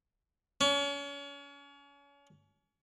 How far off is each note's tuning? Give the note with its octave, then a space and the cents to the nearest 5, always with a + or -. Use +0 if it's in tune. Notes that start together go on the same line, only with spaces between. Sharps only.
C#4 +35